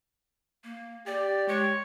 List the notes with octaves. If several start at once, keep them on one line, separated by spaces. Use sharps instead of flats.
A#3
G4 D5
G#3 C#5